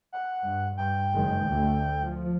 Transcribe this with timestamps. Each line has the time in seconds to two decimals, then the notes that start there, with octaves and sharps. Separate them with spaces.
0.13 F#5
0.45 G2
0.77 G2 G5
1.13 F#1 D#3 G#3
1.48 D2 D3 A3
2.03 F3